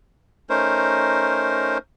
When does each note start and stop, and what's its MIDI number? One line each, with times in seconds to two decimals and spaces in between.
0.50 1.78 57
0.50 1.78 61
0.50 1.78 63
0.50 1.78 70
0.50 1.78 72